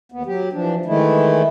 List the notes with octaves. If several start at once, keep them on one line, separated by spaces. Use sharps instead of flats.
D#2 B3
F#3 G4
E3 F3 D4
D#3 E3 G#3 A3 E4